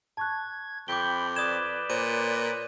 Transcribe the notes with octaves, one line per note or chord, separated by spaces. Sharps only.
A5 C#6 F#6 G#6
F2 G5 B5 D6 G6 G7
B4 D5 D#6 G#6 E7
A#2 C5 C#5 D#7